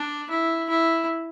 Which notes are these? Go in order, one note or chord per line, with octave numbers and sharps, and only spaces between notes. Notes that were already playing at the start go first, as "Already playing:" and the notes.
Already playing: D4
E4
E4